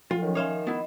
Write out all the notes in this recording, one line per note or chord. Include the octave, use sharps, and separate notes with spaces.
F3 F#3 F4 A4 F#5
D#3 C#4 C#5
A#4 C#5 E5 F5 G#5 C6 E7
B3 E4 D#5